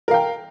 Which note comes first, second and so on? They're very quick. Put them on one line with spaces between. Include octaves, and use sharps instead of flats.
A#4 F5 G5